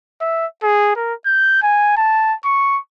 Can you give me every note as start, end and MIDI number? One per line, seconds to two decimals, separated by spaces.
0.21 0.46 76
0.63 0.96 68
0.96 1.14 70
1.26 1.59 91
1.63 1.95 80
1.97 2.35 81
2.45 2.79 85